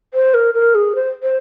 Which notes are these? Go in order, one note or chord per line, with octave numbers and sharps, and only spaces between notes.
C5
A#4
A#4
G#4
C5
C5